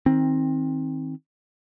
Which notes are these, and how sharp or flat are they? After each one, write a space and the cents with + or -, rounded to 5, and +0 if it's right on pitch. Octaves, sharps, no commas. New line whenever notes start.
D#3 +25 C4 +20